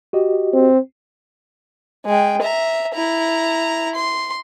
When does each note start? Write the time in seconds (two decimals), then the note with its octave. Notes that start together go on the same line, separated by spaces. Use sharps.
0.13 F#4 G4 D#5
0.53 C4
2.06 G#3 G5
2.42 E5 A#5
2.94 E4 A#5
3.95 C6